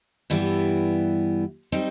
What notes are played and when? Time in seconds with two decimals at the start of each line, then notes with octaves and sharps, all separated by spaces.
0.30 G2 E3 G3 B3 E4
1.72 G3 C4 D#4